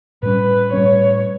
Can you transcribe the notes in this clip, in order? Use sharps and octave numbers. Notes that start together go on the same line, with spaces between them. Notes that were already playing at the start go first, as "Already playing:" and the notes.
A2 G3 C#4 B4
A2 G3 C#4 C#5